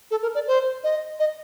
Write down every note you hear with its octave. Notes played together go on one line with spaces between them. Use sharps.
A4
A#4
D5
C5
D#5
D#5